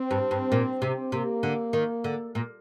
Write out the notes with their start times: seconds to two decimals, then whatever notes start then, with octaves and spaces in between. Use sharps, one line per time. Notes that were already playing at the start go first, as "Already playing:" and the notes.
Already playing: C4
0.11 G2
0.31 G2
0.52 A#2
0.82 C3
1.12 C3 A#3
1.43 D3
1.73 D#3
2.04 D3
2.35 A#2